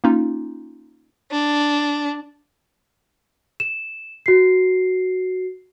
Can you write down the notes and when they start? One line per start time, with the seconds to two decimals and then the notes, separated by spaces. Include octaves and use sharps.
0.04 A#3 C#4 D#4 F4
1.31 D4
3.60 E7
4.26 F#4 C7